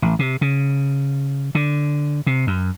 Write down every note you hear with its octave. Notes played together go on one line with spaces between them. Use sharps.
A1
C3
C#3
D3
C3
F#2